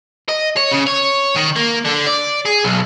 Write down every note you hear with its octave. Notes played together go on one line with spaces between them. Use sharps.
D#5
C#5
C#3
C#5
D#3
A#3
D3
D5
G#4
B1